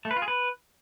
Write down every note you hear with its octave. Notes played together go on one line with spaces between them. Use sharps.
A3
B4
F4
G#4
B4